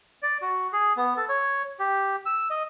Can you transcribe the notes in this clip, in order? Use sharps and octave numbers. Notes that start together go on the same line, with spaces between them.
D5
F#4
G#4
B3
A4
C#5
G4
E6
D#5